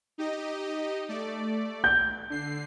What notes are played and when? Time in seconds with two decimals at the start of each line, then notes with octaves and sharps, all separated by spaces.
0.18 D#4 G4 D#5
1.09 A3 D5
1.84 G6
2.30 D3 C7